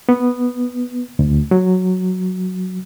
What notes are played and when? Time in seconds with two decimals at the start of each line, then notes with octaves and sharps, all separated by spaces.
0.09 B3
1.19 D2
1.51 F#3